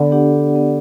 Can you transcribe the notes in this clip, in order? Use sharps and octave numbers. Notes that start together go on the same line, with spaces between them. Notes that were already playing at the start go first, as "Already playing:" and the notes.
Already playing: D3 B3
D4 G4 D5 F#5
B3